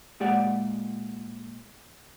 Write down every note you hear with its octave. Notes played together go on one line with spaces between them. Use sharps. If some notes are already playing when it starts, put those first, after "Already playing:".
A#2 G#3 G4 G#4 D5 F#5